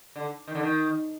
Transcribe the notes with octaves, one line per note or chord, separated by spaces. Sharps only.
D3
D#3
D3
D#3